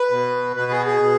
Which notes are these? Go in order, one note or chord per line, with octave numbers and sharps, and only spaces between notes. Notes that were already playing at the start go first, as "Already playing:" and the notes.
Already playing: B4
B2
B2 B4
G#4
G#4
B2